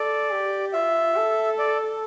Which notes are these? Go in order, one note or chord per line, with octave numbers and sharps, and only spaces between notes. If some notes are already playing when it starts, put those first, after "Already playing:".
Already playing: A4 D5
G4
F4 E5
A4
D5